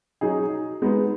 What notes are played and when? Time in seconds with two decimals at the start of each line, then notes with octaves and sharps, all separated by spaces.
0.21 F#3 D#4 G#4
0.82 G#3 B3 D#4